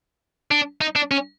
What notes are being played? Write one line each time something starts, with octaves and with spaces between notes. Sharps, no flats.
D4
D#4
D4
C#4